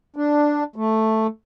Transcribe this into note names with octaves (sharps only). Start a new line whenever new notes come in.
D4
A3